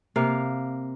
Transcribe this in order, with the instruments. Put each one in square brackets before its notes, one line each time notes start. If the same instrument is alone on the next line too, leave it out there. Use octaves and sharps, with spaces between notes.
[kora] C3 A#3 F5